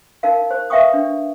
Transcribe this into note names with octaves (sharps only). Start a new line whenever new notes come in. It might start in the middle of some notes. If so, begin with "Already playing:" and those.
D#4 A#4 F5
C5
B4 E5 F5 G5 C#6 D#6
D4